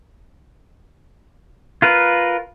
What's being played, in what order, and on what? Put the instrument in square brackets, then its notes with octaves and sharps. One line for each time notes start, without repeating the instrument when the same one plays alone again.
[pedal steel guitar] F4 A#4 B4